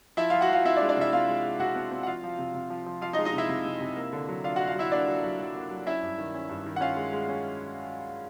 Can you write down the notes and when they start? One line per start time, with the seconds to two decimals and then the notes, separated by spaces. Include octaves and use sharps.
0.17 F3 E4 E5
0.30 F3 F4 F5
0.41 F#4 F#5
0.49 F3 F4 F5
0.65 C4 E4 E5
0.76 D4 D5
0.82 G#3
0.89 D4 D5
0.97 C3 E4 E5
1.13 C4 F4 F5
1.28 G#3
1.44 G#3
1.59 C3 F#4 F#5
1.76 C4
1.91 C4
2.03 F#5
2.07 F3 F4 F5
2.24 F3
2.39 C3
2.54 C3
2.70 F3
2.86 F3
3.01 F3 F4 F5
3.13 D#4 D#5
3.18 G#3
3.25 D#4 D#5
3.33 C3 E4 E5
3.49 C3
3.65 C3
3.80 C3
3.97 A#3
4.13 D3
4.28 F#3
4.44 D4 F4 F5
4.56 D4 F#4 F#5
4.67 F4 F5
4.75 F#3 E4 E5
4.92 A#3 D4 D5
5.08 F#3
5.23 F#3
5.39 F#3
5.55 A#3
5.71 F#3
5.86 C#4 E4 E5
6.02 G2
6.18 D#3
6.34 C#4
6.49 G2
6.66 D#3
6.76 F#5
6.81 C#4 F4 F5
6.96 G#3
7.13 G#3
7.29 C#4